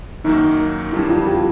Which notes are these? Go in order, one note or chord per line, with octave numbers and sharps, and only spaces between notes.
F#2 D#3 F#3 A#3 D#4
F2 D3 G3 E4
F4
G4